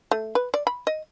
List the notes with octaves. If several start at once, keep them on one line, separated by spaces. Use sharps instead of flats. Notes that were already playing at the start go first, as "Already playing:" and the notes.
A3
B4
D5
B5
D#5